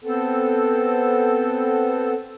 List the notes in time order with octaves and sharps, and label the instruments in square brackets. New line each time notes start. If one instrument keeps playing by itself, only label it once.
[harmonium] B3 C4 A4